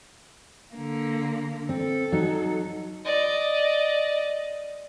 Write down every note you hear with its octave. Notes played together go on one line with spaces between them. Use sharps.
D3 A#3
C4 A4
F#3 D#4
D5 D#5